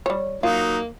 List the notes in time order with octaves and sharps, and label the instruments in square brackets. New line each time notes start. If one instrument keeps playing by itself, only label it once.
[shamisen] G3 C#5
[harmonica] F#3 D#4 [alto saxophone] A#3 [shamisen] F4